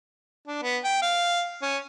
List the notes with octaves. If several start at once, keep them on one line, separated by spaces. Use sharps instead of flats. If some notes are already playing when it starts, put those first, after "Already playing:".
D4
B3
G5
F5
C#4